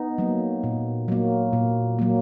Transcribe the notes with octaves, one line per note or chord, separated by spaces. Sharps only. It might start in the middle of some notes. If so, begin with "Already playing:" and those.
Already playing: B3 D#4
F#3 A#3
A#2
F#3 A#3
A#2
F#3 A#3